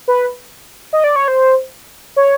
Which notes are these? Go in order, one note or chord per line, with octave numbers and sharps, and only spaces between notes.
B4
D#5
D5
C#5
C5
C#5